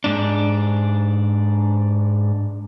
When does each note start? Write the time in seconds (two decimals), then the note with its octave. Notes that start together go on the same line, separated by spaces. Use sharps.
0.04 G#2 D4